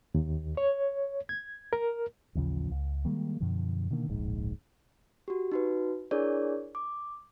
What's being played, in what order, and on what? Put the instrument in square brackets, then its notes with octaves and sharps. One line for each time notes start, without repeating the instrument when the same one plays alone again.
[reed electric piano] D#2
C#5
G#6
A#4
[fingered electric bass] A1 D#2 C#3 F3
C#2
D#3 G3 G#3 A#3
F#2 B2 D3 F3
B2 D3 D#3 A#3
D1 A#1 G#2
[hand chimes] F#4 G4
D#4 F#4 B4
D4 E4 G#4 A#4 C#5 D5
D6